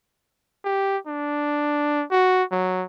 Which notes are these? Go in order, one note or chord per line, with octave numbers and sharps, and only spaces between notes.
G4
D4
F#4
F#3